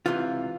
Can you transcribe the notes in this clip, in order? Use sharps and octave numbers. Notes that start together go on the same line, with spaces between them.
C#2 C3 E3 F4